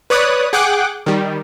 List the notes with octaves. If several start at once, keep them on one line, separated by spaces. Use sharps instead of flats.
B4 C#5 D5 D#6 F#6
G#4 F#5 G5 D6 F#6
D#3 G3